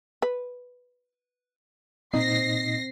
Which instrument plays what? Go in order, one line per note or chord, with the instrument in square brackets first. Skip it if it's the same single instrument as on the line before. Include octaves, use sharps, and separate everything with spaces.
[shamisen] B4
[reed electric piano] A#2 D#4 D#5 [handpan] C4 [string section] A#6 C7